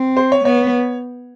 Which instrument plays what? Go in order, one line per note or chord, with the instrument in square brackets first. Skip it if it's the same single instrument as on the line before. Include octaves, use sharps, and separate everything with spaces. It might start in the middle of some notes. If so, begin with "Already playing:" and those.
Already playing: [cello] C4
[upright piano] C5
C#5
[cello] B3 [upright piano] C#5